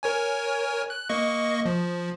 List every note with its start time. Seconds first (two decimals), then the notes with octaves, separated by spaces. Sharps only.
0.03 A#4 C#5 G#5
0.90 F#6
1.09 A#3 D#5 C#6
1.66 F3